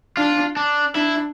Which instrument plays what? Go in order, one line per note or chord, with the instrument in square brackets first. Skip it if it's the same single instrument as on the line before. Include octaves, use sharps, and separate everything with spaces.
[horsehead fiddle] D4 [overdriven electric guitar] F4
[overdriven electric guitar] D4
[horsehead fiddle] D4 [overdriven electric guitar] E4